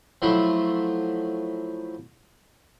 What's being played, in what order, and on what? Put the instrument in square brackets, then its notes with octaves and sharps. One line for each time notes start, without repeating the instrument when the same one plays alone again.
[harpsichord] F3 F#3 A3 E4 F4